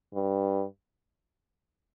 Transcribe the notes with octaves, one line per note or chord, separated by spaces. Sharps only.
G2